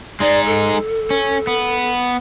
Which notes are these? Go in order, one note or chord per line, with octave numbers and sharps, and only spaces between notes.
G#3 D#4 D5
A4
C#4
B3